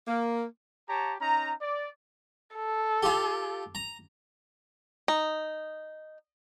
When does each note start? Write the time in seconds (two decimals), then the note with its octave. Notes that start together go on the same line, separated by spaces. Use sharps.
0.08 A#3
0.89 G4 C#5 A5 A#5
1.21 C#4 D#4 A#5
1.62 D5
2.55 A4
3.03 F4 G4
3.75 A#5
5.08 D#4